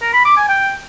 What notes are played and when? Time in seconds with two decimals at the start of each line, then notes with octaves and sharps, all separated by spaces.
0.02 A#4
0.13 B5
0.25 D6
0.37 G#5
0.49 G5